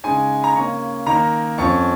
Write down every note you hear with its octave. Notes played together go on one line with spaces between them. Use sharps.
C#3 G#3 D#4 G#5
A#5
C#3 A#3 C#4 C#6
D#3 A#3 D#4 A#5
F2 F3 C#4 C#6